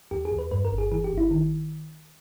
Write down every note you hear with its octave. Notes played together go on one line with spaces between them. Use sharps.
E2 G4
G#4
E2
B4
G2 B4
A#4
G1
G#4
E3 G#4
G4
G1
E4
D#3